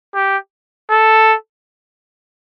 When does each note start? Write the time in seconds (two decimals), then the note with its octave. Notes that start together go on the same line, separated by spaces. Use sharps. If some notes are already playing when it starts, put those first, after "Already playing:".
0.14 G4
0.90 A4